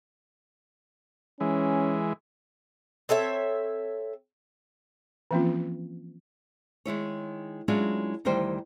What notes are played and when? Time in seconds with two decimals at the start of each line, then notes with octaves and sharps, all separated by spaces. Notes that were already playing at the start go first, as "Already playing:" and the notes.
1.40 E3 G#3 C#4
3.09 C4 A4 C#5 E5
5.31 E3 F3 A#3 C4 C#4 F4
6.85 D#3 G#3 E4 C#5
7.68 F#3 G#3 C#4 D4 E4 F4
8.25 D2 D#3 E3 G3 C5 G5